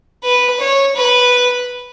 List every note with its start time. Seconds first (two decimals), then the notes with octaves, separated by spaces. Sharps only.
0.24 B4
0.60 C#5
0.96 B4